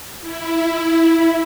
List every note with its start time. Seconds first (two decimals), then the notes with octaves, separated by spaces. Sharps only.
0.21 E4